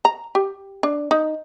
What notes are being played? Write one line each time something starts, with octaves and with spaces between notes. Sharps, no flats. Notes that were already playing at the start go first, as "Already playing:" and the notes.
A#5
G4
D4
D#4